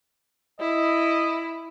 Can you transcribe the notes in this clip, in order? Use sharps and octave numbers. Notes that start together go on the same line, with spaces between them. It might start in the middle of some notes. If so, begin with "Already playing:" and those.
E4 D#5